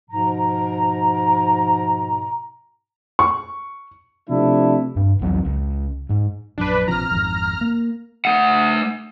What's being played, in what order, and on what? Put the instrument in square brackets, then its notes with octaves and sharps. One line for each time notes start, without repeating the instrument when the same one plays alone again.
[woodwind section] G#2 B2 F3 A#5
[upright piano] C#6
[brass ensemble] C3 F3 A3 D4 E4
[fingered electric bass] G2
C2 F2 F#3 C4
C#2
G#2
[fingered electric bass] A#1 F#2 [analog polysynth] D4 B4
[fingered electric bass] A#1 C3 F3 [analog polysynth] A#5 F6
[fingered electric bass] G#1 F2
A#3
[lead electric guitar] A3 F#5